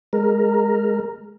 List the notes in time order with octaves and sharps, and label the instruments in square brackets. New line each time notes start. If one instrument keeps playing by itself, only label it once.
[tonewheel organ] G#3 A#4